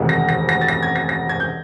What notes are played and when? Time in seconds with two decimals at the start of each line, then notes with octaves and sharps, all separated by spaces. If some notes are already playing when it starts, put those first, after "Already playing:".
Already playing: E1 D2 C3 D#3
0.09 A#6
0.29 A#6
0.49 A#6
0.61 A6
0.68 A#6
0.83 G#6
0.96 A#6
1.09 A#6
1.29 G#6
1.40 G6